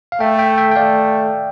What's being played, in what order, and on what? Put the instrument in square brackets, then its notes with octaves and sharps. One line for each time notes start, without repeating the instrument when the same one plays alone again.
[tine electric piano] F5
[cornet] A3 [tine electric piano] E5 G5
[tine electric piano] E5 G5
E5 G5
G5
[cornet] A3 [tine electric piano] D5 F5